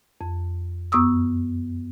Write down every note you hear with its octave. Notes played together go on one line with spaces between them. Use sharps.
F2
F#2 B3 C#6 D#6 E6